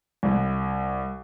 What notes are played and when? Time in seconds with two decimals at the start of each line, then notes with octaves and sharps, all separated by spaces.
0.23 C2